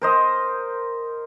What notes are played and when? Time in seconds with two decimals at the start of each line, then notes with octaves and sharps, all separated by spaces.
0.01 A#4 C5 D#5